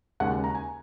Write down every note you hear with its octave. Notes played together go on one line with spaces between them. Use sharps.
D#2 C#3 G#3 F#5
A#5
G#5